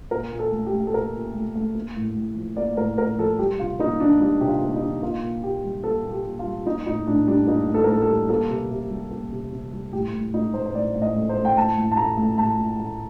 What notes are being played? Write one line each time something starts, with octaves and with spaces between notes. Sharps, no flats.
A#2 A#4
A#2
A4
A3
G4
A3
A4
A#2 A#4
A#2
A3
A3
A#3
A2
A2
F3
A#3 D5
A2 A#4
A2 A#4
F3 A4
G3 G4
C3 F4
A#3 D#4
D#3 D4
G3 D#4
C3 G4
F4
A#3
D#4
D#3
A#3 F4
A#2
A#2 G4
G3
A#3 A4
A#2
G4
A#2
F4
G3
A#3 D#4
A2 D#4
A2 D4
G3 D4
A#3 D#4
A2
A4
A#4
A2 A4
A4
G3
A#3 A4
C3
C3
G3
A#3
C3
C3
G3
A2 G4
A2
A3 D#4
A3 C5
C5
A2 D5
A2
D#5
A3
C5
A3
G5
A2 A5
A2
A5
A3 A#5
A3
A2 A5
A2
A3